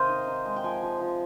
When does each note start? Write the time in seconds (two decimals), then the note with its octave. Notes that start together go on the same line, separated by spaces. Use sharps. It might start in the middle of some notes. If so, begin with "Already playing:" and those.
Already playing: C3 D#3 C5 D#5 F5
0.09 D#4
0.27 D#4
0.45 G#3
0.56 G5
0.64 F3 G#5
0.82 F3
1.01 F3